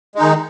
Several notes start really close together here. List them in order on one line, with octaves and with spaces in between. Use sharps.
G#3 D#4 D#3